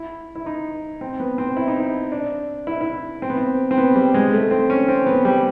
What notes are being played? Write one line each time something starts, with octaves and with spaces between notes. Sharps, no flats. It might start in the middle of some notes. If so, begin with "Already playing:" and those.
Already playing: E4
E4
D#4
C4
B3
C4
E4
D#4
E4
D4
E4
E4
C4
B3
C4
C4
B3
G3
G#3
A3
C4
C#4
C4
B3
G3